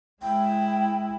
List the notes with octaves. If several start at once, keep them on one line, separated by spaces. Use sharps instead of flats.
G#3 E4 G5